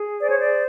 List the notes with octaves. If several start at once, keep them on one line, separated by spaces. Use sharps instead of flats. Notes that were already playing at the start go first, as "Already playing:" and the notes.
Already playing: G#4
C5 D5
C#5
D5